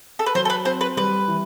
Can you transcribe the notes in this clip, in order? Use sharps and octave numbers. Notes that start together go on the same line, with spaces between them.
A4
B4
F#3 C5
A4
B4
C4 C5
B4
G3 B4
E3